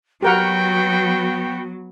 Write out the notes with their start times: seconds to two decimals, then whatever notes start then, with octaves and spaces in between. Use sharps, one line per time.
0.23 F#3 B3 F#4 G4 A#4 F#5 G5